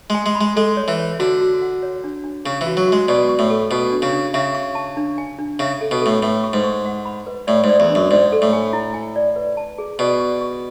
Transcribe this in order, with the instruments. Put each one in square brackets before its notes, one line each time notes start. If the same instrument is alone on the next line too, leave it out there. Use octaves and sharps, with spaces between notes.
[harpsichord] G#3 [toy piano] G#5
[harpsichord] G#3
[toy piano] B5
[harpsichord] G#3
[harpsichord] G#3 [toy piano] A4
[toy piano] C#5
[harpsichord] E3
[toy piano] C#5
[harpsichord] D3 [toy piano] F#4
[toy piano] F#4
F#5
C#5
D4
D4
[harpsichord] C#3 [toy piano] C#5
[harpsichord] E3
[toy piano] F#4
[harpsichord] F#3
[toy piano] F#4
[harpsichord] G#3
[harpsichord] B2 [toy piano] D5
[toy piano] C#6
[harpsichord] A2
[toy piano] A4
[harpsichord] B2 [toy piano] F#4
[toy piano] D4
[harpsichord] C#3
[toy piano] D4
[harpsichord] C#3 [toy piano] E5
[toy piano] C#6
A5
D4
G#5
D4
[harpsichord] C#3 [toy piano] E5
[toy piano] A4
[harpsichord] B2
[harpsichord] A2 [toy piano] A4
[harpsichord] A2 [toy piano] B4
[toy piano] C#6
[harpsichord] G#2
[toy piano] C#6
F#5
B5
B4
[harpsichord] A2 [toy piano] D5
[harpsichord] G#2
[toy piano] D5
[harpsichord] E2
[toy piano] D4
[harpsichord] F#2
[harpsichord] G#2 [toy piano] D5
[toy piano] A4
[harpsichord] A2
[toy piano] G#5
E4
G#5
D5
B4
A5
G#4
[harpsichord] B2 [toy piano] D5
[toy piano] C#6
C#6